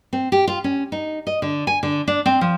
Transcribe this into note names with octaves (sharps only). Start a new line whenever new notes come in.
C4
G4
F4
C#4
D#4
D#5
D3
G#5
D3
D4
C4
F3